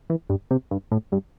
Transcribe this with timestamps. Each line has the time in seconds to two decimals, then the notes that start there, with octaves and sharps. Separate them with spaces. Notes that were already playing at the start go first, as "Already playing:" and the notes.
0.10 E3
0.30 G2
0.51 C3
0.71 G2
0.92 A2
1.12 G2